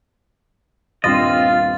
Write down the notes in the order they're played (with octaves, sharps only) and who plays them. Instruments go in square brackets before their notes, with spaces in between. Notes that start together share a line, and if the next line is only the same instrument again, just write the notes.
[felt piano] D#1 G2 C6 [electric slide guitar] C4 D#5 [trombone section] F4 [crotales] A6